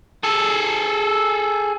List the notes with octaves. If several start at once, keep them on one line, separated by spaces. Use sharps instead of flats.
G#4 A4